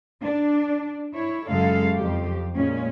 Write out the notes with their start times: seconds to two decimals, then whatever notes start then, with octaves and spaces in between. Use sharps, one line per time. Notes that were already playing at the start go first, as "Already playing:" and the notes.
0.22 D4
1.16 E4 C#5
1.49 F#2 C#3 G#3 A4 F5
1.94 F2 G4
2.55 A#2 G#3 C#4